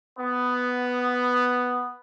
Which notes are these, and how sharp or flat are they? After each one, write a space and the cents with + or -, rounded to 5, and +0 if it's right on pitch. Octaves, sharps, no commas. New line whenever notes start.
B3 +5